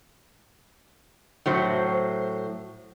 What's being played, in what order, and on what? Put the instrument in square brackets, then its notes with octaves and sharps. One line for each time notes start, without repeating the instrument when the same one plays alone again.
[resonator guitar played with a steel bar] A2 F#3 C5